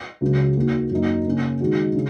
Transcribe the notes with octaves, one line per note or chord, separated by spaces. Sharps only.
C#2 C#3 F#3
D#2 D#3 A#3 F#4
F#2 F#3 A#3 D#4
C#3 A#3 C#4
D#3 G#3 D#4 F#4
C#3